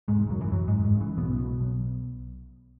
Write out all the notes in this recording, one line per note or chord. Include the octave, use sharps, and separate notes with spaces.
E1 G#2 G#3
F#2 C#3 F#3
E3
F#1 F#2 F#3
G#2 G#3
F#1
G#2 G#3
C#3
E3
B1 B2 B3
B2
B1